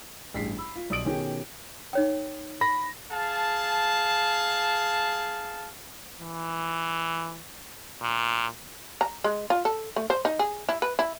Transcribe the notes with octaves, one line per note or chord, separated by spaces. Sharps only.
A1 G2 G#4 B6 C7
B5 E6
F4
B1 D5 D#6 D7 F#7
B2 D#3 C#4 G4 G#4
D#4 C#5 G5
B5 A#6
G#4 F5 A5
E3
A#2
A#5
G#3
F4
A4
A3
C5
D#4
G#4
E4
B4
E4